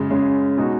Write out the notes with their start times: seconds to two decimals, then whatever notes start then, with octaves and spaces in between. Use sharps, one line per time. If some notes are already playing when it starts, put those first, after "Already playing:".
Already playing: F#2 C#3 G#3
0.10 F#2 C#3 G#3
0.57 B2 G#3 D#4 F#4